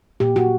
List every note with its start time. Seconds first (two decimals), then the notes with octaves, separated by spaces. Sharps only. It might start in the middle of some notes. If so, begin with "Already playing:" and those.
0.20 A#2 G4
0.36 F#4